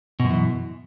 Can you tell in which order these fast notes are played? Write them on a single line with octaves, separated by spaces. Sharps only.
B2 F#2 E3